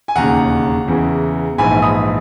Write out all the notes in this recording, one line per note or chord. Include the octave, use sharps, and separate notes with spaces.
G#5
E1 D#2 C#3 F#5 A#5
E2 C#3 E3
A#1 G#2 E3 G#5 B5
B5 D#6